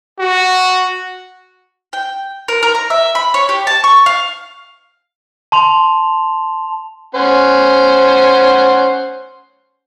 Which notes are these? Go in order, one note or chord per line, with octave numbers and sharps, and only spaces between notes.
F#4
G5
A#4
A#4
A#5
E5
B5
C#5
G4
A5
C#6
F5
A5 C6 F7
C#4 C5 F#5